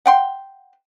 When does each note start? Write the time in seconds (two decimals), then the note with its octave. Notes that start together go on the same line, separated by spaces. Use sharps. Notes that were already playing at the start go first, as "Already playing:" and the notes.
0.06 F#5 G5 C6